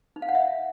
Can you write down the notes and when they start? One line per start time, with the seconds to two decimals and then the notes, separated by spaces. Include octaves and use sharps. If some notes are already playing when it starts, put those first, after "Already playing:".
0.16 D#4
0.22 F5
0.29 F#5
0.35 E5